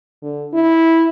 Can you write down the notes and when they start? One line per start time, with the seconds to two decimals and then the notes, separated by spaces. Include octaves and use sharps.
0.22 D3
0.53 E4